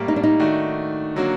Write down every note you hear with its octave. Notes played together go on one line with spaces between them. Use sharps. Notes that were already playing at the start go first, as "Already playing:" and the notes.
Already playing: A2 G3 A#3
D#4
D4
D#4
D#3 A3 D4 F#4
D3 F#3 A#3 F#4